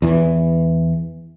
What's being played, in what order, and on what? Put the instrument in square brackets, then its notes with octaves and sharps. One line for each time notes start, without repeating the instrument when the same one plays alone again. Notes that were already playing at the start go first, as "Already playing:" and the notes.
[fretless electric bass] E2 E3